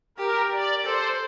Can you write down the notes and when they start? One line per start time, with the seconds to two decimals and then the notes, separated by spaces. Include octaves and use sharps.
0.18 G4 A#4
0.52 D5
0.85 A4 C5